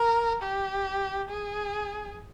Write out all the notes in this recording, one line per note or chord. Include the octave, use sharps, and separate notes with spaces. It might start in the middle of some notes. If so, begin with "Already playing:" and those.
Already playing: A#4
G4
G#4